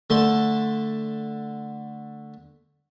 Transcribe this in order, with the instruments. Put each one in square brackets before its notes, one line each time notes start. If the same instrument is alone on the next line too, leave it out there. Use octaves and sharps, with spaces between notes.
[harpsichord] D3 A3 C6